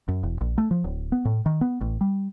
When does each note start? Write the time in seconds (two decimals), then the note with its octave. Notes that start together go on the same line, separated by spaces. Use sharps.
0.08 F#2
0.23 E1
0.41 A#1
0.58 A3
0.71 F3
0.84 D1
1.12 B3
1.25 A2
1.46 D#3
1.61 B3
1.81 A1
2.01 G3